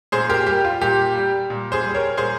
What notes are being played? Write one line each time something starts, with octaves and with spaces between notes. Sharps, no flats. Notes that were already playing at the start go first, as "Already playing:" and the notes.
A#2 G#4 C5
G4 A#4
G3 G4
F4
A#2 G4
G3
A#2
G#4 C5
G3
A#4 C#5
A#2 G#4 C5